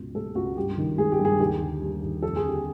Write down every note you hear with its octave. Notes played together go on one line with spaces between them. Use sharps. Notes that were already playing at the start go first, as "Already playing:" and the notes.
Already playing: C#2 B2
G#3 A4
C#2 F#4
G2 G4
D#3
G#3 G#4
G4
G2
G#4
D#2 G4
D3
G3
D#2
F2 A4
G#4
D3 G4